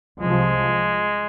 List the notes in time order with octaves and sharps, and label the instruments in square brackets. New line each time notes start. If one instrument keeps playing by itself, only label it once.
[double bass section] C2 C3 F3 [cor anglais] G#3